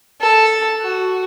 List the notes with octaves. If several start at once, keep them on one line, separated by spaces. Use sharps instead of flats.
A4
F#4